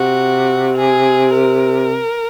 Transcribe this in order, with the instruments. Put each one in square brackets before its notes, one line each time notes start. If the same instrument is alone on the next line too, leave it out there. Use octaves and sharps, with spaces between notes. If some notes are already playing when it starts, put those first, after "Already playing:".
Already playing: [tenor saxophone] C3 [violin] F#4
[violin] G#4
A#4